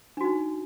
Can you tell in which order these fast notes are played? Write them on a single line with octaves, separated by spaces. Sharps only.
D4 F#4 D#4